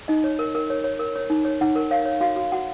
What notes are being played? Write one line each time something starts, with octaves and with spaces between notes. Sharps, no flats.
D#4 D#5
C#5
A#4
A#4
C#5
C#5
A#4
C#5
D#4
C#5
D#4 F#5
A#4
C#5 F5
C#5
F#4 F5
F#4
F#4 F#5